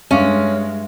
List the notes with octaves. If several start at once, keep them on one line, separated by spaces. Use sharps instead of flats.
G2 G#3 C#4 E5 F5